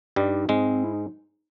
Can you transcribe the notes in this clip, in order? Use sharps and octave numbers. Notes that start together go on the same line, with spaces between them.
G2 G3 D#4
G#2 G#3 C4
E4
D#4